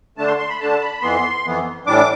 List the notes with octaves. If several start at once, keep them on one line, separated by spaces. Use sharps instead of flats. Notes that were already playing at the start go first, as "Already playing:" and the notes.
D3 A3 D4 A5
C6
C6
B5
D3 A3 D4 A5
B5
F2 E3 B3 C6
F2 E3 B3
A2 E3 G3 D4 D6